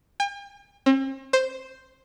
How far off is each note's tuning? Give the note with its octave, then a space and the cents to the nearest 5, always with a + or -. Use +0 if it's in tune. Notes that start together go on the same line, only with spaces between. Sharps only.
G5 +45
C4 +45
C5 +0